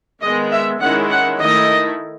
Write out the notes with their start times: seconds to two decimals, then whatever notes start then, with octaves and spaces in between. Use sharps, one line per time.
0.22 D#3 G#3 B3 D#5
0.51 E5
0.81 D#3 G#3 C#4 E4 F#5
1.10 F#5
1.40 D#3 A3 E4 D#5